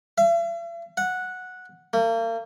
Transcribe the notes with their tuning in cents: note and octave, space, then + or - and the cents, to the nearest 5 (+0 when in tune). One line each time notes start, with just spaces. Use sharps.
E5 +45
F#5 -10
A#3 -40